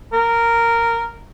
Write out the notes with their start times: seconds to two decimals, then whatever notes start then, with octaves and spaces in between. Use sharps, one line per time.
0.13 A#4